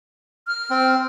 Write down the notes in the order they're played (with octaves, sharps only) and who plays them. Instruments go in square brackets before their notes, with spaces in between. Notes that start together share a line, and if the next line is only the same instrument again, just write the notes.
[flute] F6
[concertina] C4